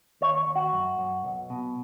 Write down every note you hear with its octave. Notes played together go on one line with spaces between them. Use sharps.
D#2 C#5
D#2
F#4
F#2
F#2
B1
B2